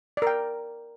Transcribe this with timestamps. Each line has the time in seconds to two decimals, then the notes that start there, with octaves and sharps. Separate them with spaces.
0.17 D5
0.22 A#4
0.27 G5